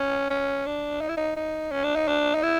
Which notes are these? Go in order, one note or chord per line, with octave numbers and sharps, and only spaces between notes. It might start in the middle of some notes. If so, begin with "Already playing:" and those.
Already playing: C#4
C#4
D4
D#4
E4
D#4
D#4
C#4
D4
D#4
D4
D#4
E4